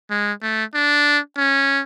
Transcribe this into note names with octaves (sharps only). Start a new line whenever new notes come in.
G#3
A3
D4
C#4